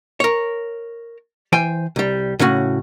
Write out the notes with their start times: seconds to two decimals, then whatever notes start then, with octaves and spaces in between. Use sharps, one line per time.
0.20 A#4 C#5
1.52 E3 C5 G5 G#5
1.96 C2 G3
2.39 A2 C#3 C#4 F#4